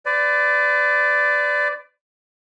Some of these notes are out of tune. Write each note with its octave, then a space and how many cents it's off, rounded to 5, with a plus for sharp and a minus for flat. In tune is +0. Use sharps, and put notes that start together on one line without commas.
B4 +40 D5 +0